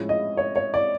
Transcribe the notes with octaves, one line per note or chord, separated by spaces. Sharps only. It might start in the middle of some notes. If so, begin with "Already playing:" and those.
Already playing: A2 F3 G#3 C#4 E4
D#5
C#5
C#5
D5